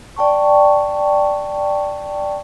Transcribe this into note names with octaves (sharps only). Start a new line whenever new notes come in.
D5 G5 A5 C#6